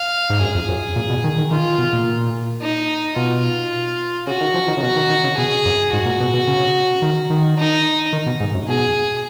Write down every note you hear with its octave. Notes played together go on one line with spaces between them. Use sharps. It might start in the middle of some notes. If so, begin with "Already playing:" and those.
Already playing: F5
G#2
F#2 G#4
F2
F#2
A#2
B2
D#3
D#3
D#3 F4
B2
A#2
D#4
B2 F4
C#3 F#4
D#3
F3
D#3
C#3
B2 F#4
D#3
D#3
C#3
B2 G#4
F#2
G#2 F#4
A#2
B2
B2
C#3
D#3
D#3
D#4
D#3
B2
G#2
F#2
B2 G#4